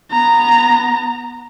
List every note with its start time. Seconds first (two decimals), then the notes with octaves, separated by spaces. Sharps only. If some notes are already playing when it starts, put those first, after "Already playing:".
0.11 B3 A#5